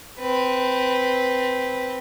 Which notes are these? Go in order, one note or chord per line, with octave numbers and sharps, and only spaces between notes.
C4 B4